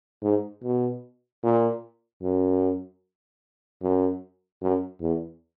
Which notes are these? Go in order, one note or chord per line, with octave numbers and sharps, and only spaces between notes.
G#2
B2
A#2
F#2
F#2
F#2
E2